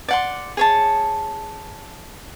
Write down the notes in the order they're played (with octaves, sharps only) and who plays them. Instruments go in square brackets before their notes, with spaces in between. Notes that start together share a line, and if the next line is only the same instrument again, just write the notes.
[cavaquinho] D5 F#5 C6
G#4 C#5 A5